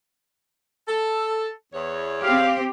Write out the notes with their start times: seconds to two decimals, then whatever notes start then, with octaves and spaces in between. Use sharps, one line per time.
0.87 A4
1.72 E2 C#5
2.22 C4 G4 F5